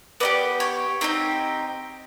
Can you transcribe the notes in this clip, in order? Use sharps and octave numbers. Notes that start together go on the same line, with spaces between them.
B3 D#4 G4 D5
C#5
C4 D#4 G4